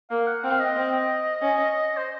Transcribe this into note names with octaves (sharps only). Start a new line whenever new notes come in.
A#3 F5
F#5
C4 F5
D#5
C4
C#4
C5